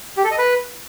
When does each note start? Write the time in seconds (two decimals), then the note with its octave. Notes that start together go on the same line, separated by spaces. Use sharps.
0.17 G4
0.24 A4
0.31 D#5
0.38 B4